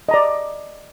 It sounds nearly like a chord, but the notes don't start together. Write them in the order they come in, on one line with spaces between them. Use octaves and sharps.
D#5 A#5 D5